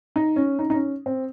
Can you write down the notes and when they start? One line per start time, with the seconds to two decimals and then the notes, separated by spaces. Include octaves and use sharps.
0.16 D#4
0.36 C#4
0.59 D#4
0.70 D#4
0.74 C#4
1.06 C4